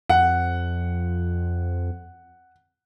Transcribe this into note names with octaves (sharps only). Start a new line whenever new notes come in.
F2 F#5